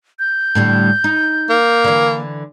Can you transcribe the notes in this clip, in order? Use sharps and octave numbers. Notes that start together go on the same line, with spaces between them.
G6
A2 D3 G3
D#4
A#3
D3 E3